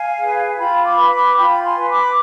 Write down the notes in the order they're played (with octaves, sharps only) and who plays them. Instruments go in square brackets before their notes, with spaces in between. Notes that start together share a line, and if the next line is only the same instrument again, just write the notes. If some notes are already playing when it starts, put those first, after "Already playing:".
Already playing: [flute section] F5 G#5
G#4 B4
F4 G5 B5
B5 D6
B4
B5 D6
F4 G5 B5
G#5 C6
B4
B5 D6